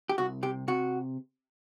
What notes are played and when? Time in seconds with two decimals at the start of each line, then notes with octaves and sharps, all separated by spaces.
0.09 G4
0.18 C2 F#4
0.43 C3 G4
0.68 C3 F#4